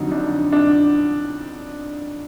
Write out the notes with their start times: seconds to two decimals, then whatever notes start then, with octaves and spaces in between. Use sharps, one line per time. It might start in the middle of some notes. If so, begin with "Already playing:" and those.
Already playing: F2 D3 F#3 D#4
0.12 D4
0.52 D4